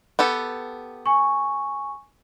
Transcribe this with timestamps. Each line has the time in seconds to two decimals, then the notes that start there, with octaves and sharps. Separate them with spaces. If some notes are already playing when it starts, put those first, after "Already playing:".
0.19 B3 G4 A4
1.06 G#5 C#6